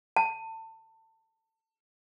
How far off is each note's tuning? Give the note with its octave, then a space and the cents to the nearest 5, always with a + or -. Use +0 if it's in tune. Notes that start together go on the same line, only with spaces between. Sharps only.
A5 +25